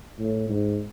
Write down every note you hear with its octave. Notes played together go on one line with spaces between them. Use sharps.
A2
G#2